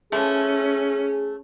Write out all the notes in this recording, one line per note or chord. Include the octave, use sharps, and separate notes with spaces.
E3 F3 A3 C#4 G#4